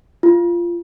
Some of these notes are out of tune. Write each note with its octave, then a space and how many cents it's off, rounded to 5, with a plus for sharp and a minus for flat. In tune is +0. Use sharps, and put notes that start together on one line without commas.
F4 -15